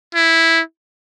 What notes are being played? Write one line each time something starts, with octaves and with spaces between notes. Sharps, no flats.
E4